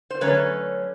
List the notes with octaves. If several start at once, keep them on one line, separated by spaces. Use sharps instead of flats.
C5
D3 F#3 A3 C#4 B4 C#5